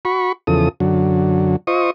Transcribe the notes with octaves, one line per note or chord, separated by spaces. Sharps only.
F#4 B5 C#6
E2 C#3 F3 A4 D#6
F#2 D3 F#3
F4 C5 D#5 C#6 D#6